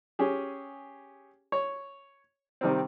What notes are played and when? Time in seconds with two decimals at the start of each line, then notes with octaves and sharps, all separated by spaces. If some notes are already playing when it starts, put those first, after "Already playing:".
0.19 C#4 G4 G#4
1.52 C#5
2.61 C3 D#3 G3 C4